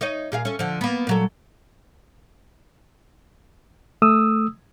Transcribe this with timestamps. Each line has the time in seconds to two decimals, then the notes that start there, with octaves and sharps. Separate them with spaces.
0.01 D#4 C#5 D#5
0.32 A#2 G#4 F5
0.45 C#4 A4
0.59 D3 F3
0.81 A#3 B3
1.07 A#2 F#3 A3
4.02 A3 D#6 E6